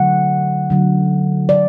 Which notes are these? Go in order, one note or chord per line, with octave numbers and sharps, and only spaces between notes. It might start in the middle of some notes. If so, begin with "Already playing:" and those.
Already playing: D3 F#3 A3 F#5
D3 F#3 A3
D5
D3